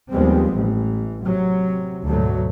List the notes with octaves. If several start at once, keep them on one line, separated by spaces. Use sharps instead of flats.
D#2 F3 G3 G#3 B3 C4
A1 E3
C3 F#3
D2 G#2 B2 F#3 A3